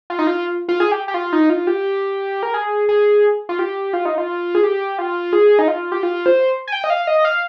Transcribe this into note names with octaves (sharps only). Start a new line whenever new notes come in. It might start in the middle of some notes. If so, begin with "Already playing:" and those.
F4
D#4
F4
F4
G#4
G4
G4
F4
D#4
F4
G4
A#4
G#4
G#4
F4
G4
F4
D#4
F4
G#4
G4
F4
G#4
D#4
F4
G4
F4
C5
G#5
G5
D#5
F5
D#5
F5